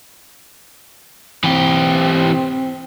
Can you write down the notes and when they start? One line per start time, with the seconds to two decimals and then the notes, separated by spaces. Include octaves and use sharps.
1.44 E3 C4 G4